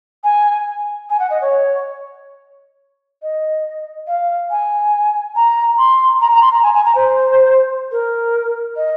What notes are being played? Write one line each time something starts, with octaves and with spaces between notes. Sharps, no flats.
G#5
G#5
F#5
D#5
C#5
D#5
F5
G#5
A#5
C6
A#5
A#5
C6
A#5
G#5
G#5
A#5
C5
A#4
D#5